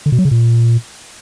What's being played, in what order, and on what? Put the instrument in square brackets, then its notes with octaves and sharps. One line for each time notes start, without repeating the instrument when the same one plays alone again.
[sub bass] D3
B2
F#3
C#3
A#2